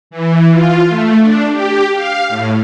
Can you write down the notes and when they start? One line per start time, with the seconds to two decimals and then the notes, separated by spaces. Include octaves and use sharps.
0.11 E3
0.52 F4
0.89 A3
1.21 D4
1.51 G4
1.95 F5
2.29 A2